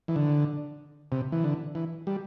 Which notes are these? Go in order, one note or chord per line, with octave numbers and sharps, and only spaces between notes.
E3
D3
C3
E3
D3
E3
G3